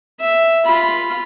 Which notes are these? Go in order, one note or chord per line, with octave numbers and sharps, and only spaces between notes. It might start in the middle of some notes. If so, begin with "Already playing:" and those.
E5
F4 B5